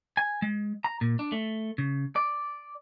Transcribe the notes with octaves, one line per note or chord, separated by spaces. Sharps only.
G#5
G#3
A#5
A#2
D4
A3
C#3
D5